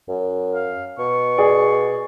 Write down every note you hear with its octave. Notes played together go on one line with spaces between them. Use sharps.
F#2
F5
B2 C#6
G#4 D5